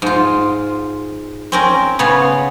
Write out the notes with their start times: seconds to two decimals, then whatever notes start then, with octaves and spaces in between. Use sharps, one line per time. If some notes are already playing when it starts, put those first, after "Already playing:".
0.02 G#2 F4
1.52 C4 C#4 A#4
1.99 C#3 B3 C#5 F5